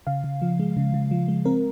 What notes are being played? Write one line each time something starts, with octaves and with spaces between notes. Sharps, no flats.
C#3 F5
C#3
F3
G#3
C#3
C#3
F3
G#3
C4 A#4